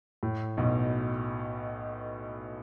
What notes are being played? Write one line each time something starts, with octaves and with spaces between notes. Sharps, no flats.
A2
B1 B2